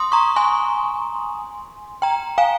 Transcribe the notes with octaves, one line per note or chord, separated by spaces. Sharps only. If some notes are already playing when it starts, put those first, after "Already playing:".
Already playing: C6 D#6
A#5 C#6
G#5 C6
G5 A#5
F5 G#5